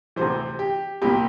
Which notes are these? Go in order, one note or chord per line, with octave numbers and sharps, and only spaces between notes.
D2 C3 E3 C5
G4
C2 A#2 G4